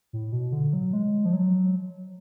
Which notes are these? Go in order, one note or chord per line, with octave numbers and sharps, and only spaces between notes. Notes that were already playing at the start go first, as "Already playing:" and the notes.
A2
B2
D3
F#3
G#3
F3
F#3